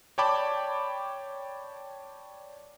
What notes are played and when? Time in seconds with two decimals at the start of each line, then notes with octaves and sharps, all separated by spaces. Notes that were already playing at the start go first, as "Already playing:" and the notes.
0.18 C#5 D5 G5 A5 B5 D6